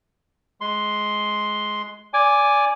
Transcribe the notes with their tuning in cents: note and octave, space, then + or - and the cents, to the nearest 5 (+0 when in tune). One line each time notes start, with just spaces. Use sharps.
G#3 +15 C6 +0
D5 -25 G#5 -5 D6 +0